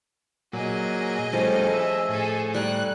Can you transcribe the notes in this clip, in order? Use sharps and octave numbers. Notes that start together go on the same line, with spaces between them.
A#2 F#3 G#4 D#5
F3 G3 A3 C#4
E5
A2 G#4 A4
G3 G#5 A#5 F#6